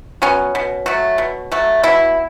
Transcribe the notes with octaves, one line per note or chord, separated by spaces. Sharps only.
F#3 B3 C#4
B2
F#3 A3
B2
F#3 A3
B2 E4